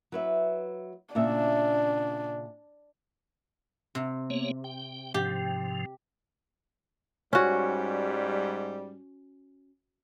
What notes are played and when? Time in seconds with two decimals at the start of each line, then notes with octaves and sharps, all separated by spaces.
0.12 F#3 B4 E5
1.15 A#2 C#3 D4 E5
3.95 C3
4.30 A#3 B3 C#5
4.64 G5
5.14 G#2 C3 F3 G4
7.33 G#2 G3 C#4 F#4